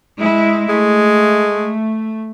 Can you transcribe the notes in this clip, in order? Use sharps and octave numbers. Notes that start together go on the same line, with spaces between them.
G#3 E4
G#3 A3